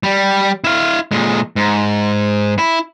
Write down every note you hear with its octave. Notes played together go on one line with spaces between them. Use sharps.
G3
E4 F5
A#2 G#3
G#2
E4